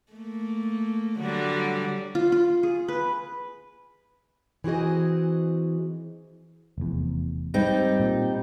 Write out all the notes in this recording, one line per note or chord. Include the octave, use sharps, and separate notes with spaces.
A3 A#3
D3 F#3 G3
F4
F4
G#4
B4
E3 C4 F#4 G#4 D#5
F1 E2
G#2 G3 C4 D#4
A#2